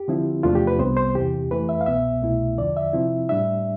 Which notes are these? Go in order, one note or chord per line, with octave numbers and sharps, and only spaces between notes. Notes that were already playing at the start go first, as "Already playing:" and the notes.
Already playing: G4
D3 F3 C4 E4
E2 C3 F3 A3 D4 F4
G4
B4
C2 C3 G3 B3 C5
C5
E2 C3 E3 G4
F2 E3 A3 E4 B4
E5
F5
C2 B2 B3 E5
C2 B2 A3 E4
E2 D3 F3 D5
E5
C3 F3 C4 E4
A2 G3 D4 E5